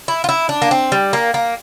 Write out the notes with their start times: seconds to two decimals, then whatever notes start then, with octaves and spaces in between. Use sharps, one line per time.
0.08 E4
0.24 F4
0.29 E4
0.49 D4
0.62 A#3
0.71 C4
0.92 G3
1.13 A#3
1.34 A#3